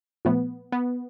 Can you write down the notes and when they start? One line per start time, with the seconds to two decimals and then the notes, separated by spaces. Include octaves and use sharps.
0.25 A#2 F3 A3 B3
0.72 B3